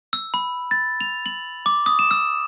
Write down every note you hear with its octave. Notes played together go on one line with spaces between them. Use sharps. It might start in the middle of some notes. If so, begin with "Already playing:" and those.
E6
B5
A6
F7
F#7
D6
D#6
E7
E6